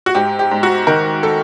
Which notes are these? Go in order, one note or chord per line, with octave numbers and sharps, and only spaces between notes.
F#4
G#2 G4
G4
G#2
F#4
D#3 A#4
A4